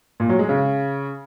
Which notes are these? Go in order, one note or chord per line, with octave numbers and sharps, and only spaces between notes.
A#2
F#3
G#3
C#3